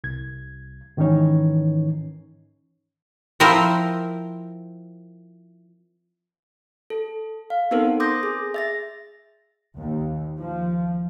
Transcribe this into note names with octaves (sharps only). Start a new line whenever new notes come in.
C2 G#6
G#2 D#3 E3 C#4 D#4 C#5
F3 C4 E4 A#4 C5
A4
F5
B3 C4 D#4 A4 A#4 C5
C6 D6 D#6 G6 A#6
G#4
E5 A6 A#6
D#2
F3